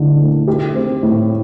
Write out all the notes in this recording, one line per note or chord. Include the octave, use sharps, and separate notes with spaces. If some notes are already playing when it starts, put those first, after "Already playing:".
Already playing: D3 E4
A3
G4
C4
A2